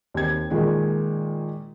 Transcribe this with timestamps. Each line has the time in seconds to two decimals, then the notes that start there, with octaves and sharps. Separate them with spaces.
0.14 D#2 C4 G#6
0.50 A#2 D#3 G#3